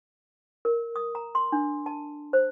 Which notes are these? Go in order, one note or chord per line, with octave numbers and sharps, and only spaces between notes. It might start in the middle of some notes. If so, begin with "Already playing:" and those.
A#4
D#6
A#5
C6
D4
A5
C5